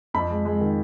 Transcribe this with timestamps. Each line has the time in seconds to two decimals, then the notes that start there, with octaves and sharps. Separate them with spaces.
0.14 F2 B5
0.30 G#3
0.45 G#3
0.61 D#3